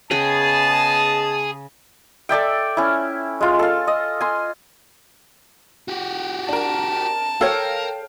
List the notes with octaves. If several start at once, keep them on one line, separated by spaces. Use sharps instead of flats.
C#3 B3 G#4 D#5 F#5 G5 A5
A4 D5 E5 G5
C#4 E4
G#3 F4
A4 F5
D#5
G#5 C6
F#4 G4
D4 A#4 A5
A4 A#4 C#5 F5 G5 F6